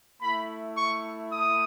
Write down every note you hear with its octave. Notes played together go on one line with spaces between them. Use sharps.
A3 E4 B5
C#6
D#6